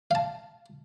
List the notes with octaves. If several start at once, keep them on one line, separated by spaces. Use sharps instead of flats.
F5 A5